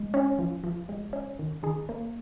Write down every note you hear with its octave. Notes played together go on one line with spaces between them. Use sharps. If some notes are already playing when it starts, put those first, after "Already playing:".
Already playing: G#3
C#4
F3
F3
G#3
C#4
D#3
D#3 G#4
A#3